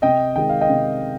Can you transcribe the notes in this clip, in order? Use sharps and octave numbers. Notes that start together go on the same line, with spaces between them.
C3 D#5 G5
D#3 G#3 G5
F5
D#5 G5
C3